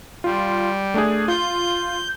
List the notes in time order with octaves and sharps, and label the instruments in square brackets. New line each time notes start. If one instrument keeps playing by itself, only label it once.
[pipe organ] G3 [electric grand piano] F4
[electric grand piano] A3 D4 G#4
[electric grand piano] F4 [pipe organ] G6